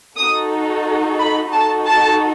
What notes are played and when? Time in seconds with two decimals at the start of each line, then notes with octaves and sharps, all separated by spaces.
0.17 D#4 F#4 A4 D#6
1.19 B5
1.53 D#4 F#4 A4 A5
1.87 A5